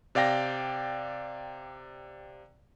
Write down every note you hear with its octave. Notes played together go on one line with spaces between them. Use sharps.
C3 D5 F5 G5 A#6